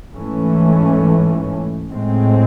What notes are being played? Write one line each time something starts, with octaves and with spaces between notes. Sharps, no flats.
G#2 E3 A3 C#4
A2 G#3 C4